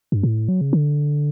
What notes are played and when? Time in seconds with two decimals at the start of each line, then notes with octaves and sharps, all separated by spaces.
0.12 G2
0.23 A2
0.48 F#3
0.61 C#3
0.73 D3